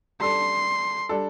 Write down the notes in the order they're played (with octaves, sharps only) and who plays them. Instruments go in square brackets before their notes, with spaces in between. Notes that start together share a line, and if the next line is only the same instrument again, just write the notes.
[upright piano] G3 D4 A4 [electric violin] C6
[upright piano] G3 D4 A4